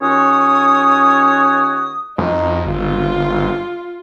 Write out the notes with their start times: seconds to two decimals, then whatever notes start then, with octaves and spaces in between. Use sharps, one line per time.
0.02 D#2 C#4 F4 F#4 C#5 D#6
2.18 F2 D#4
2.66 G1 F4